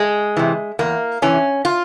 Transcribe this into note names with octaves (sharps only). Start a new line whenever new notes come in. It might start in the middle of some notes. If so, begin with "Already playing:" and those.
Already playing: G#3
C3 E3
E2 A#3
C3 E3 C#4
F4